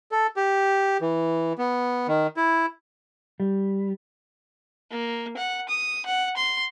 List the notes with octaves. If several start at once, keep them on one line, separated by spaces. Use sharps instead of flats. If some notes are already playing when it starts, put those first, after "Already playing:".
A4
G4
E3
B3
D#3
E4
G3
A#3
F#5
D#6
F#5
C6